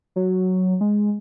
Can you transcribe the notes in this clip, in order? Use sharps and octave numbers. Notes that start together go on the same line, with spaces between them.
F#3
G#3